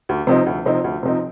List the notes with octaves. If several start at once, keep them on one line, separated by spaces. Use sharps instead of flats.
D2
C3 F3 C4 D#4
D2
C3 F3 C4 D#4
D2
C3 F3 C4 D#4